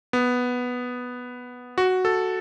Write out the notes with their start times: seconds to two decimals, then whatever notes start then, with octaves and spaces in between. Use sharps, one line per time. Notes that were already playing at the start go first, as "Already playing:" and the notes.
0.13 B3
1.78 F#4
2.05 A4